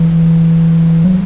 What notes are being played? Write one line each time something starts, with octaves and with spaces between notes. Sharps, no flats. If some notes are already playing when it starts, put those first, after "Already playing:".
Already playing: E3
F#3